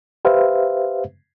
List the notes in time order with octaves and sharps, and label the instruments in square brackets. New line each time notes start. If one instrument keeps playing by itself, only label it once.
[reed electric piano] G4 B4 C5 E5 F5